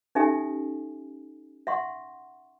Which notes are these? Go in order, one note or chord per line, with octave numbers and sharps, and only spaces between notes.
C#4 D#4 G4 A4 E5 G#5
E5 F#5 C6 C#6